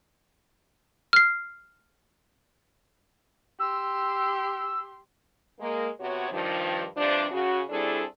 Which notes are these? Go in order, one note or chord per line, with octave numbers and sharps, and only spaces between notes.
F6 C7
G4 C6 E6
G#3 A#3
C3 B3 F#4 C#5
G2 D#3 F3
G2 C3 F3 D4
C#3 F#4
G3 C4 D4 E4 G#4 A4